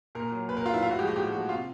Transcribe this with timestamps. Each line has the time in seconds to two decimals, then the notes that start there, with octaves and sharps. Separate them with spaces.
0.15 A#2 A#4
0.32 F#3
0.49 A#2 B4
0.57 A#4
0.65 F#3 F4
0.74 E4
0.82 A2 F4
0.91 F#4
0.99 F3 G#3 G4
1.07 F#4
1.16 A2 G4
1.32 G#3 F#4
1.37 F3
1.49 C3 F4